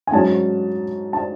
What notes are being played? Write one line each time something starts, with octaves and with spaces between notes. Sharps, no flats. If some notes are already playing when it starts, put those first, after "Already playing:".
G#5
G#2 F#3 C#4 E4 A5
A5